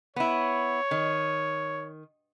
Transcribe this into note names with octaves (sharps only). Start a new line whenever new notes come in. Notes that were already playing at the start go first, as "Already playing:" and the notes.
B3 E4 C#5
D#3